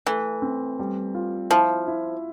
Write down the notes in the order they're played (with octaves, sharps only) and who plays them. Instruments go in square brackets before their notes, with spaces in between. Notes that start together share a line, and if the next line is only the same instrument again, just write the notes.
[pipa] E3 [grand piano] A3
[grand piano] C4
G3
F4
[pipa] F3 [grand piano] E4
[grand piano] E4